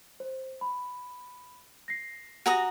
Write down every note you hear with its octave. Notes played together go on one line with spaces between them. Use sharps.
C5
B5
A#6 C7
F#4 G4 G#5 A#5 D#6